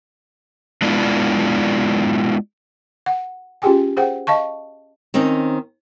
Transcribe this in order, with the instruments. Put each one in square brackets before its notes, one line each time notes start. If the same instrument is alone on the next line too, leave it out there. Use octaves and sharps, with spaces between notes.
[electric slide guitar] G#3 B3 D4 E4 F4 D5
[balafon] F#5
C#4 F4 G4 G#4 G5 G#5
G#4 C5 F#5 G5
D#5 F5 A5 C#6
[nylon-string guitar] D#3 C4 C#4 D#4